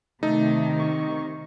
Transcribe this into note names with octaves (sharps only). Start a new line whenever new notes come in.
C3 D#3 A3 D#4
C#6